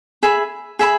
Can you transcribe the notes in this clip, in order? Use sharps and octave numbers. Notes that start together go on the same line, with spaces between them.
G#4 E5 G#5 B5
G#4 E5 G#5 B5